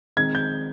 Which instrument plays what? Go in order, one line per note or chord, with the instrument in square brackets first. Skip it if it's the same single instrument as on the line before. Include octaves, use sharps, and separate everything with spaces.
[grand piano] D#3 G#3 C4 D#4 G#6
G6